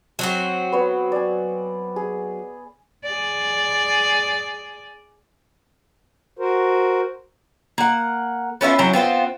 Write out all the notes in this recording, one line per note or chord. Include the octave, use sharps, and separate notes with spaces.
F#3 C4 F#4
B3 C#5
D5 G#5
G#4
G#4 D5
F#4 A#4 C5
A#3 F#5
B3 C#4 E4 F4
F#3 C4 C#4 E4
B3 C4 F4 C5